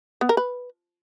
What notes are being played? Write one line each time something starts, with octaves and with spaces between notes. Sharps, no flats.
B3
A#4
B4